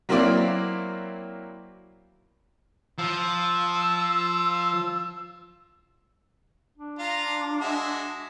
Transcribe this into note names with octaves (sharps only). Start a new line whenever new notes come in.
F#3 A#3 C4 E4 D5 F5
F3 E6
D4
F4 F5 A#5
G#3 F#4 E5